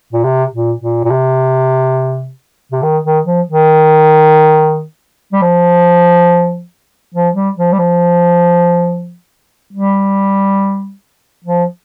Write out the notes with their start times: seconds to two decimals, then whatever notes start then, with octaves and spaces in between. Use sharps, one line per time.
0.13 A#2
0.24 C3
0.53 A#2
0.81 A#2
1.04 A#2
1.10 C3
2.72 C3
2.83 D#3
3.04 D#3
3.26 F3
3.48 D#3
5.32 G3
5.42 F3
7.14 F3
7.35 G3
7.56 F3
7.72 G3
7.79 F3
9.73 G3
11.44 F3